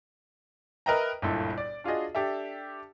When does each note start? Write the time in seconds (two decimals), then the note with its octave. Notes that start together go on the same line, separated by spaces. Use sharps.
0.86 A#4 B4 D#5 E5 G5 A#5
1.22 G1 C#2 A#2 E4 A4
1.58 D5
1.84 D4 F4 F#4 G#4 D#5
2.15 D4 G4 A4 E5